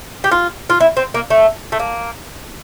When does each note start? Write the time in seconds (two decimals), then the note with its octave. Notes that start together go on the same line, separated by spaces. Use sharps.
0.24 G4
0.31 F4
0.70 F4
0.80 E4
0.97 C4
1.14 A#3
1.30 A3
1.72 A3
1.79 A#3